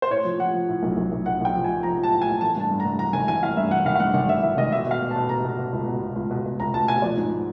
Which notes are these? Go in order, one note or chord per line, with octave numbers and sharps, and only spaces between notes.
C5
A2 C#5
F3
F3 F#5
F3
A2
B1
B1
B1
B1 F#5
B1 G5
F3
G#5
F3
F3 A#5
F3
A5
A2
G#5
A2
E3 A5
G2 A5
G2
A#5
G2
E3 A#5
G#1 G#5
E3 G#5
E3 F5
G2 E5
E3 F#5
G#1 F5
F5
G2 F#5
G#1 F#5
G#1 E5
E3 E5
G#1 D#5
B2 E5
B2 F5
B2
A5
B2
B2 A#5
B2
B2
C#2
B2
B2
C#2
B2
B2
C#2 A#5
C#2 A5
B2 G#5
F3 D5
G#2